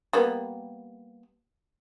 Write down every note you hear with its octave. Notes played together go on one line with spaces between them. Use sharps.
G3 A#3 B3